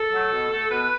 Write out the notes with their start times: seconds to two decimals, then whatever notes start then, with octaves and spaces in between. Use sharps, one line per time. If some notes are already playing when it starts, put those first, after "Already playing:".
Already playing: A4
0.13 F#3 A3
0.32 B2
0.50 A3
0.70 B2 B4